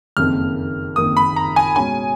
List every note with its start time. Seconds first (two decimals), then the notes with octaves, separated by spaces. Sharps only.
0.17 F#1 F2 D#3 A#3 F6
0.96 F#1 F2 D#3 A#3 D#6
1.17 B5
1.36 A#5
1.56 G#5
1.76 B2 G#3 C#4 G#5